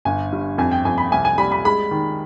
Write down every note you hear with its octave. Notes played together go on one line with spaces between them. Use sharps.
G1 G#5
G2
F2 G#5
G5
F2 G#5
B5
C2 G#5
G#5
G3 B5
B5
G#3 B5
D#3